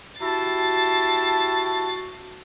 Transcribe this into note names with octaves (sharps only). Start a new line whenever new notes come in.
E4 F#4 G4 A5 A6 C7